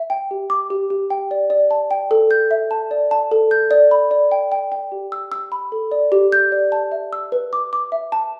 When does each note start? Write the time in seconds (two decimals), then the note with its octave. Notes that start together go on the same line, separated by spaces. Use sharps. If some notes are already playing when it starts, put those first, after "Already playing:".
Already playing: E5
0.10 G5
0.31 G4
0.50 D6
0.70 G4
0.90 G4
1.10 G5
1.31 D5
1.50 D5
1.71 A5
1.91 G5
2.11 A4
2.31 G6
2.51 E5
2.71 A5
2.91 D5
3.11 A5
3.31 A4
3.51 G6
3.71 D5
3.91 B5
4.11 D5
4.32 G5
4.52 G5
4.72 G5
4.92 G4
5.12 E6
5.32 E6
5.52 B5
5.72 A4
5.91 D5
6.12 G4
6.32 G6
6.52 D5
6.72 A5
6.92 E5
7.13 E6
7.32 B4
7.53 D6
7.73 D6
7.92 E5
8.12 A5